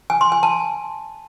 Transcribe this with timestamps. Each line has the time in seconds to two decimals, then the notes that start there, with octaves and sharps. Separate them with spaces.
0.10 G#5
0.21 C6
0.32 G#5
0.43 A5